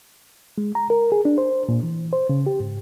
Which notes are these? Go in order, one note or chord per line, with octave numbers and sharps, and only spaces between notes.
G#3
A#5
A#4
G#4
D4
C5
A#2
E3
C5
C#3
G4
G#2